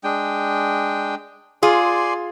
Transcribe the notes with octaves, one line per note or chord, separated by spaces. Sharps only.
G#3 D4 G5
F4 G#4 D5 G#5 C6